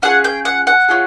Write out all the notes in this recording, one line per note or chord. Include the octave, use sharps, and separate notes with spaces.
C#4 F4 G#4 F#5
G5
F#5
F#5
C#4 F4 G#4